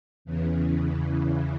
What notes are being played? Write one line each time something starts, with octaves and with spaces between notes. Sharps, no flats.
E2 C#3 E3